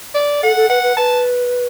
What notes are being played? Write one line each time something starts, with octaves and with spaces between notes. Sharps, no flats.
D5
A4 F#5
A4
B4 F#5
B4
B4 A5